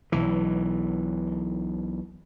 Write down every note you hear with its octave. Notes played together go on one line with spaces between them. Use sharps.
B1 E3